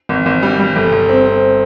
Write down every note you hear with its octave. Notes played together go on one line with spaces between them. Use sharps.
G#1
G#1
G3
G3
G1
G1
C4
C4